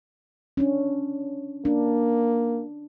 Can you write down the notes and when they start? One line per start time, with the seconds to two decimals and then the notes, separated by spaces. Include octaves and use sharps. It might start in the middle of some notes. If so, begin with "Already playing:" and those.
0.57 C#4 D4
1.65 A#3 D4